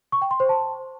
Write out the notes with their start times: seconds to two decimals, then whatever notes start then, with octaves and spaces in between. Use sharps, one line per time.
0.12 C#6
0.22 G5
0.31 C6
0.40 C5
0.49 A5